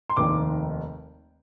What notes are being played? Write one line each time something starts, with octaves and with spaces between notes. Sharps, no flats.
C6
F1 D#2 D#3 D6